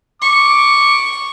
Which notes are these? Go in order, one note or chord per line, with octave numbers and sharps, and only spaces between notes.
C#6 D6